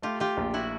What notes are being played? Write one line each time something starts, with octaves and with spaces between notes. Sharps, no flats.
A3 F4 G4
F4 G4
A#1
E4 F#4